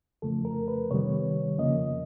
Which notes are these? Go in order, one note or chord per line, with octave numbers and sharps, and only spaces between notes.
F2 C#3 F3 A3 A4
A#4
B4
C3 D#3 G3 B3 C#5
F2 C#3 F3 A#3 D#5